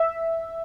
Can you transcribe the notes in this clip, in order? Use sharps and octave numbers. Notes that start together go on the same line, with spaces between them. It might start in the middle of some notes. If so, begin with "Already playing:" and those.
Already playing: E5